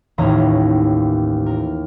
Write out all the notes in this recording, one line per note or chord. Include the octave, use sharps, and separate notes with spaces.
A1 D#2 C#4 A#5
A#4